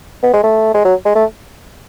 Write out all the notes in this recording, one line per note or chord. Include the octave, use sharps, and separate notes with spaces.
B3
G#3
A3
G#3
F#3
G#3
A3